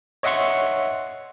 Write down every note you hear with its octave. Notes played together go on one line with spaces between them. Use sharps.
C#5 D#5 E5 F#5 C6 C#6